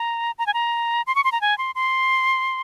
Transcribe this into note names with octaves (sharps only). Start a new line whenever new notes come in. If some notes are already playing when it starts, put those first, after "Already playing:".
Already playing: A#5
A#5
G#5
A#5
C6
C#6
C6
A#5
G#5
C6
C6